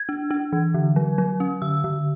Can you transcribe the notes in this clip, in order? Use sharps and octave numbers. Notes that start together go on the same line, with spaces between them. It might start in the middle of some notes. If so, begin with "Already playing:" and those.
Already playing: G#6
D4
D4
E3
D3
F#3
F#3
C#4
D3 E6
D3